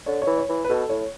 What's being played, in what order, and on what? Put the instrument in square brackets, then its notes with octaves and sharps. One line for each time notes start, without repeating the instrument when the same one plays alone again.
[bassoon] D3 [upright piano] C#5
[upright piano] C#5
[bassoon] E3
[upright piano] C#5
[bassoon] E3
[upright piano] B4
[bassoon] B2 [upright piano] A4
[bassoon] A2 [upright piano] C#5